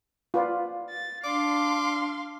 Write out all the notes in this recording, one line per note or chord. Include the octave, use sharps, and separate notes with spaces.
F4 B4 D5
A6
D4 F5 C6 D6